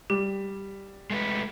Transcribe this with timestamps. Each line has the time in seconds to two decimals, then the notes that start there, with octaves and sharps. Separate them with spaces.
0.10 G3 G4
1.10 G#3 A3 B4